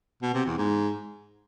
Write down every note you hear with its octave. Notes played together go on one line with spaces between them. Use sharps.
B2
C3
E2
G#2